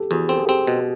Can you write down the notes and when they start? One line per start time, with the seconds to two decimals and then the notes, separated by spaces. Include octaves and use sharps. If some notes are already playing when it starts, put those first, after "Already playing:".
Already playing: G4 A4
0.11 E2 F#4 G#4
0.29 C4 A4
0.38 G#4
0.47 C4 G4 A4
0.67 B2